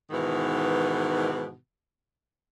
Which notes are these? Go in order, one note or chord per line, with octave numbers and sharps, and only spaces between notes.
G#2 B2 D#3 E3 B3